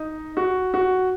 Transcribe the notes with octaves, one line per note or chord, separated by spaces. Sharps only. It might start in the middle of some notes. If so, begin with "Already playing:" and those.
Already playing: D#4
F#4
F#4